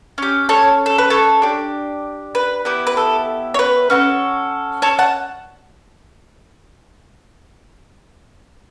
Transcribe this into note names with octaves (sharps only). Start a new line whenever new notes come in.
C#4 G4
A4 C#5
A4
B4
A4 C#5
D4 G4
B4
B3 E4 G4
B4
A4
C#5
B4
C#4 F#4 A4
A4 C#5
F#5 A5